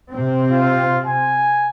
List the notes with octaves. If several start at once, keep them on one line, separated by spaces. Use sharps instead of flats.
C3 C4
F4
G#5